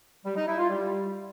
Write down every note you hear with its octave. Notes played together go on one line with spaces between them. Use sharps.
G3
D#4
E4
F4
G3